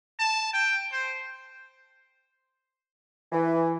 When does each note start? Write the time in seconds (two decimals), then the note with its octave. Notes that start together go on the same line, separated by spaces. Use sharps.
0.19 A5
0.53 G5
0.92 C5
3.32 E3